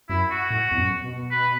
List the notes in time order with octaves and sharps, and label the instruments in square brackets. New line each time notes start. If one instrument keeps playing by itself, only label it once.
[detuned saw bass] F#2 [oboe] E4
[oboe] F#4
[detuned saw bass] A2
E2
F#2
B2
[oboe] B4